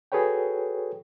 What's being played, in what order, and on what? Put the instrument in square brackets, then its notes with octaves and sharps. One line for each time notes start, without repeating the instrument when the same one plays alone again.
[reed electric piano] F#4 G#4 A4 B4 C#5 G5